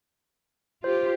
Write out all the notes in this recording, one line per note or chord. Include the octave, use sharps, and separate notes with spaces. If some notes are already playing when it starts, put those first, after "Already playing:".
F4 G4 C5